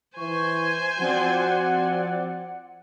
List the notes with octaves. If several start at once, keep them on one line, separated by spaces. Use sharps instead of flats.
E3 C5 G#5 C#6
F3 C4 F#4 D5 F#5